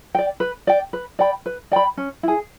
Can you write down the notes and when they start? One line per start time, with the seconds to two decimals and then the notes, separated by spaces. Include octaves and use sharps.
0.15 D5 G5
0.40 B4
0.67 D5 G5
0.93 B4
1.19 D5 G5 B5
1.46 B4
1.72 D5 G5 B5
1.97 C#4
2.23 E4 G#4